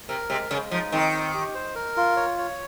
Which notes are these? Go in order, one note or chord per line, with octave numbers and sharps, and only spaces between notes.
C3 A#4
C3 G#3
C#3 G#3
F3 D#4
D#3 C4
C4
G4
C5
A#4
F4
C#5
C#5